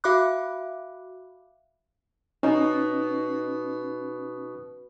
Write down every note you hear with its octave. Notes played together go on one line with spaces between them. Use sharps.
F#4 E5 F5 B5 D6 F#6
B2 C#4 D#4